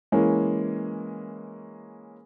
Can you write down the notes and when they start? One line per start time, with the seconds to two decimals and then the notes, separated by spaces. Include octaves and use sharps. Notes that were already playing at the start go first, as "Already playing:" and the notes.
0.12 E3 G#3 A#3 C#4